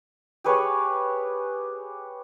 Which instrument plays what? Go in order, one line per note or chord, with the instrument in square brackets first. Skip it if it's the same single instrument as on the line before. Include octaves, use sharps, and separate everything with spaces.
[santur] G4 G#4 B4 C#5